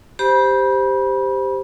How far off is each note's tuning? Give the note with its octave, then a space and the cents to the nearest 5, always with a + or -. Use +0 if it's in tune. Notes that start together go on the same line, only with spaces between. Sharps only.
G4 +0 C5 -5 B5 -30